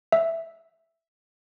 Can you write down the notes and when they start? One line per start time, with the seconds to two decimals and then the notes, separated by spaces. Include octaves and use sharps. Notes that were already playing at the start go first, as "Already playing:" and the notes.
0.12 E5